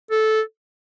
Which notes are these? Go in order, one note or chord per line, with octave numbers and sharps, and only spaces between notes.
A4